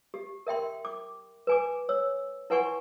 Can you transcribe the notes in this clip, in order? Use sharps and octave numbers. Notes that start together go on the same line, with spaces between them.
G4
A#4 E5 G5 C6
D6
B4 G#5 D6
C#5 E6
E4 B4 F#5 G#5 C6 C#6